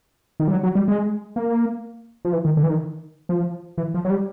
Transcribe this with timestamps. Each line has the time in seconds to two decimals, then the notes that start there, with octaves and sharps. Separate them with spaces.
0.40 D#3
0.48 G3
0.52 F#3
0.63 F#3
0.75 G3
0.88 G#3
1.36 A#3
2.25 F3
2.33 E3
2.45 D#3
2.57 D3
2.63 E3
2.69 D#3
3.29 F3
3.78 E3
3.94 F3
4.05 F#3
4.10 G3